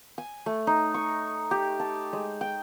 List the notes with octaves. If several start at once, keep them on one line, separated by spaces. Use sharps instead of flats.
G#5
A3
D#4
C#6
G4
A5
G#3
G5